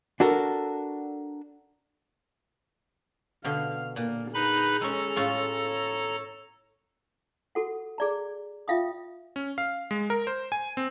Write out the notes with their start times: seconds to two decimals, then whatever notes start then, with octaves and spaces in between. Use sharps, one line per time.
0.20 D4 F#4 A4 A#4
3.45 B2 D3 F5
3.96 A#2 A#3
4.34 D#4 G#4 B4 B5
4.81 G#3 C#4 A4 A#5
5.16 A2 C#4 F4
5.65 C#5
7.55 F#4 A4 F#5
7.98 G#4 D5 A#5
8.68 F4 E5 F5 G5 D#6
9.36 C#4
9.58 F5
9.91 G#3
10.10 A#4
10.27 C5
10.52 G#5
10.77 C4